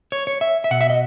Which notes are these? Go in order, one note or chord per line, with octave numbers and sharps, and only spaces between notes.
C#5
C#5
E5
E5
B2 F#5
E5
D#5